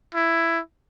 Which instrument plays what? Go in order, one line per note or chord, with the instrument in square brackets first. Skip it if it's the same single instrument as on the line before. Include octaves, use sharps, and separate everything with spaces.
[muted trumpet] E4